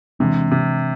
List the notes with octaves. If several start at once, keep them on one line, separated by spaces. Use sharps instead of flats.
C3 E3 G#3 D4
C3